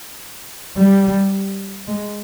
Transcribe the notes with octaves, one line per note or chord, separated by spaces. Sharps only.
G3
G#3